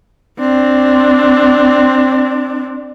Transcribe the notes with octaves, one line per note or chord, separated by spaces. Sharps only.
C4 D4